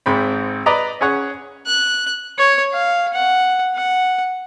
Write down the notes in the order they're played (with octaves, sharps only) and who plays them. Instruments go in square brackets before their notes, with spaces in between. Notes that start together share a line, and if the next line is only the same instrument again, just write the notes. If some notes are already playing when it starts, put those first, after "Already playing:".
[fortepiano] G#1 G#2 C4 B5
B4 D5 D#5 A#5 B5
C#4 G#4 C#5 F#5
[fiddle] F#6
[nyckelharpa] C#5
F5
F#5
F#5